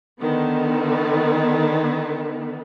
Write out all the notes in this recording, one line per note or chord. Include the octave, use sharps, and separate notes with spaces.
D3 D#3 B3